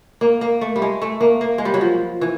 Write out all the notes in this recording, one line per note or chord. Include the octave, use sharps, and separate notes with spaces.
A#3
A#3
A3
G3
G#3
A3
A#3
A#3
G#3
G3
F#3
F3
E3